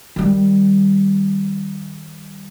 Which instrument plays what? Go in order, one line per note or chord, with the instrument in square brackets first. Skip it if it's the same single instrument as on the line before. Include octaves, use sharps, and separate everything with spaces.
[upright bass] D#3 G3